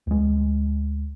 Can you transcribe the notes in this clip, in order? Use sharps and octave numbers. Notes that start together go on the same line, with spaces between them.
D2 G#3